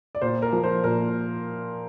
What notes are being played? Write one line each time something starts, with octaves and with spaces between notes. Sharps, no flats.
D5
A#2 C5
A#4
F3 A#3
C5
A#2 A#4